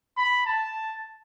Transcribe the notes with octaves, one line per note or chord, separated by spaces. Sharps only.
B5
A5